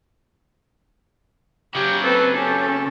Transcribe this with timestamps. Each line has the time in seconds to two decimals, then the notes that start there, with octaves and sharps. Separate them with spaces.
1.75 C#3 F#3 G4
2.04 C4 A4 B4
2.37 C#4 G4 A4